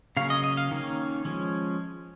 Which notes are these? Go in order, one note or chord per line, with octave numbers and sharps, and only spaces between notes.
C#3 F#3 A#3 C#4 F5
D#5
D#5
F5
D#3 A#3 C#4
F3 G#3 C#4